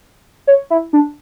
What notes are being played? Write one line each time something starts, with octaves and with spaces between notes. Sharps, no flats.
C#5
E4
D4